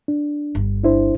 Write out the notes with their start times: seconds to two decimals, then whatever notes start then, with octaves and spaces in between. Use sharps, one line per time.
0.08 D4
0.55 G1
0.84 D4 E4 C5